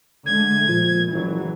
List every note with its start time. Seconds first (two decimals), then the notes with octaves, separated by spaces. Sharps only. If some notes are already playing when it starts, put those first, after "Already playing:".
0.26 D3 G#3 A3 G#6
0.68 A#2 F3
1.11 F#1 E3 F#3